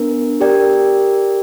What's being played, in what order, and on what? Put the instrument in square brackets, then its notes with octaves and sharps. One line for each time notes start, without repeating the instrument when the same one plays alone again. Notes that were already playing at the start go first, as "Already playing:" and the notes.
Already playing: [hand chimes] B3 D4 A#4
G4 A#4 D5 G5